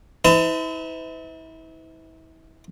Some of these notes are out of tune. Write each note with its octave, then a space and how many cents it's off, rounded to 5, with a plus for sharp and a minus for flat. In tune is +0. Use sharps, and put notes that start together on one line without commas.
E4 -40 B4 +45 A5 +30